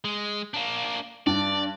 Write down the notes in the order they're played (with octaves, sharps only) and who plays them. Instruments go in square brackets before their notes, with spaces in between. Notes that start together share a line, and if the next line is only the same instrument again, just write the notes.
[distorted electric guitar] G#3
A#3 D4
[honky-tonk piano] G2 [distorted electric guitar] D5